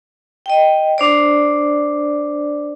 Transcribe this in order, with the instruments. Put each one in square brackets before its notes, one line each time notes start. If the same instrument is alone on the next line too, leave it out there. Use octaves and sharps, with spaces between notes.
[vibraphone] D#5 G5
D4 C5 D5